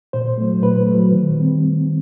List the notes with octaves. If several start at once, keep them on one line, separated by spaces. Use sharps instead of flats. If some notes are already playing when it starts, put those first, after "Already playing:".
A#2 C5
F#3 A3
A#2 B4
F#3 A3
D#3
G3 C4